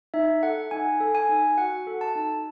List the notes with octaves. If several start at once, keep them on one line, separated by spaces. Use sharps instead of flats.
D#4 E5
A4 F#5
D#4 G#5
A4
G#5
D#4
F#4 F#5
A4
A5
D#4